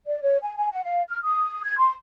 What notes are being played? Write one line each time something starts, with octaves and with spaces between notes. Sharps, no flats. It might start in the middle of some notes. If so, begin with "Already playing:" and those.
D5
C#5
G#5
G#5
F#5
F5
F6
D#6
G#6
C6